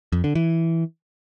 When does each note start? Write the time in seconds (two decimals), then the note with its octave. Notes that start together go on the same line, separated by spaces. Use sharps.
0.12 F2
0.24 D3
0.35 E3